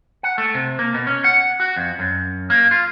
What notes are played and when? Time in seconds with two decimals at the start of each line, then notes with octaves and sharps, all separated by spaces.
0.23 F#5
0.38 A3
0.55 C3
0.79 A#3
0.94 B2
1.07 C#4
1.24 F#5
1.60 F#4
1.76 F2
1.99 F#2
2.50 A#3
2.71 F4